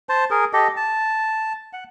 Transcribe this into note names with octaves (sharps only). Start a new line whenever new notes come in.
C5 A5
G#4 A#4
G4 A4 D#5
A5
F#5